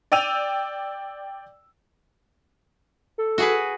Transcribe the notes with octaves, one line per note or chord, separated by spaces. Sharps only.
D5 G5 E6 D#7 F7
A4
F#4 G#4 B4